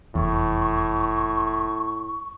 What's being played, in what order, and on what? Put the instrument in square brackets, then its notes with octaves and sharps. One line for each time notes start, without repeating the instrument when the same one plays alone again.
[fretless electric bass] F1 E2 [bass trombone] A2 [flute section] C#6